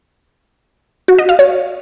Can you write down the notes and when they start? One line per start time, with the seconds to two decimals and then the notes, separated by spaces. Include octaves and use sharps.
1.08 F#4
1.19 D#5
1.29 F5
1.39 C#5